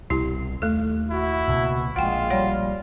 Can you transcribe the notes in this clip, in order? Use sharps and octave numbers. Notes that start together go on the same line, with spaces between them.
C2 B2 E4 G4
D#2 A3 A4
E4 F#4
C#2 B2 A#3
A#1 G#3 F4 F#5 G5
G3 C#5 F#5